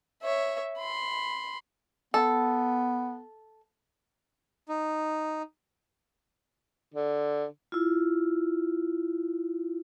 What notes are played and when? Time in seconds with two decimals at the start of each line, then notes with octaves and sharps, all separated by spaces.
0.23 C#5 E5
0.77 B5 C6
2.14 B3 A4
4.69 D#4
6.94 D3
7.72 E4 F4